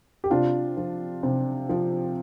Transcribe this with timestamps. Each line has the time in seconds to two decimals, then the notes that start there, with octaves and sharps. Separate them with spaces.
0.24 G4
0.30 C3 D4 F4
0.77 F3
1.23 C3
1.69 F3